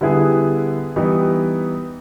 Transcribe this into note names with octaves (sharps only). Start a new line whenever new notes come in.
D3 G3 B3 E4 G#4
E3 G3 B3 D#4